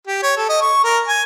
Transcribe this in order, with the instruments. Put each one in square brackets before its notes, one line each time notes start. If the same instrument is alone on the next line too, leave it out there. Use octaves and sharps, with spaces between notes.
[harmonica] G4
C#5
A4
D#5
C#6
A#4
G#5